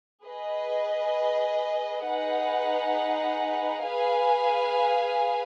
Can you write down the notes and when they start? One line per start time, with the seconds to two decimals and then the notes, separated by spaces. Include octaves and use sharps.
0.23 G#4 B4 D#5
2.03 D#4 G#4 B4 F#5
3.82 G#4 B4 F5 G#5